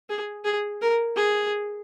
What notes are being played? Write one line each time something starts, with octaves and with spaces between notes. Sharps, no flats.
G#4
G#4
A#4
G#4